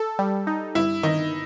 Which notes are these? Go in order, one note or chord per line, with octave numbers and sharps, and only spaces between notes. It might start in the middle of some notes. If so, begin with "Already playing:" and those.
Already playing: A4
G3
D#4
G2 E4
D#3 D#4